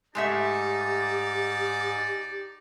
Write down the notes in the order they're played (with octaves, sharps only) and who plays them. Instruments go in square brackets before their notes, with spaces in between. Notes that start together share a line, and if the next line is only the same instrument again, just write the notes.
[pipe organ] G#2 [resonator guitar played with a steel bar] G#3 A3 E5 [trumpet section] D#4 D5 A5 [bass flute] G4